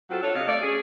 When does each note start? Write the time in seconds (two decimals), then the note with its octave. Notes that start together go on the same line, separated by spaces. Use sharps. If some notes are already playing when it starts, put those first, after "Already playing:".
0.10 F#3 C4 F4 F#4 A4
0.23 D4 F4 A4 C#5
0.35 C3 D#5 F5
0.47 A3 C#5 D5
0.62 C#4 G#4